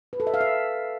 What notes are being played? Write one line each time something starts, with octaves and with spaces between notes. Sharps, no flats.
B4
A4
E5
F5
E5